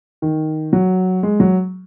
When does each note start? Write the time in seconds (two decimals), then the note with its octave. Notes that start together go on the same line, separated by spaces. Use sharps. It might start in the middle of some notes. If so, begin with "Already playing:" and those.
0.22 D#3
0.73 F#3
1.23 G#3
1.40 F#3